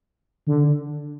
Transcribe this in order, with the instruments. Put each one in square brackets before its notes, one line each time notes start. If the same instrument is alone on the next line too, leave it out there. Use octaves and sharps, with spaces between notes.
[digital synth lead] D3